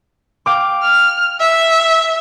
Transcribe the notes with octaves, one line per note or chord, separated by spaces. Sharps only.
F5 G5 D6
F6
E5